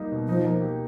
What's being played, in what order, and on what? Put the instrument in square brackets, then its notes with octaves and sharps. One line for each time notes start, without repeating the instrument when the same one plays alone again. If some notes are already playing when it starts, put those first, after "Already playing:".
Already playing: [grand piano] G3 A#3 D#4
B2
[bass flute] F3 [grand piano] D#4
[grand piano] A#3
G4